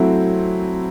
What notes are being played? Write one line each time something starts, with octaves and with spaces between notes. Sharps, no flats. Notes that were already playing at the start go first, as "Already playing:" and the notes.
Already playing: F#3 A3 C4 E4